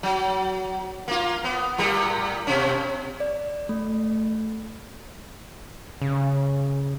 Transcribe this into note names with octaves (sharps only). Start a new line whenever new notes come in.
F#3
A#3 F4
B3
A2 G3 A#4
B2 C#4
D5
A3
C#3